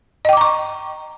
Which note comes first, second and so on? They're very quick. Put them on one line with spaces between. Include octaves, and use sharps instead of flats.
D#5 G5 D6 A#5 C#6